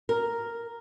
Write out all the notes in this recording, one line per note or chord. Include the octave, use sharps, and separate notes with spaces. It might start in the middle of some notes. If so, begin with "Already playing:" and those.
A#4